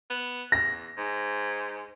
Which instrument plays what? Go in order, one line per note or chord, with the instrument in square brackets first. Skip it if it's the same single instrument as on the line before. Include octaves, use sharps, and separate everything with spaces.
[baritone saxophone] B3
[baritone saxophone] E2 [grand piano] A#6
[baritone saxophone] G#2